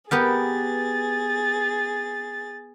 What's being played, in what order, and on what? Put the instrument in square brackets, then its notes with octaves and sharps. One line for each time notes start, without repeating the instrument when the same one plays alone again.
[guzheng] B3 G4 A#4 [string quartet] G#4 A6